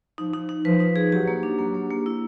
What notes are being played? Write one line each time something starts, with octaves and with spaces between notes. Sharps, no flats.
F3 D#4
D#4
D#4
F3 B4
D#4
G#4
F#3 G4
A#3
D4
F#3 A#3
A#3
A#3
E4